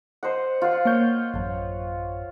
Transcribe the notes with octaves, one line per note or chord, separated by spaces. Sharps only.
C5 D#5 F#5
F4 F5 F#5
A#3 C#5 G6
A1 F#2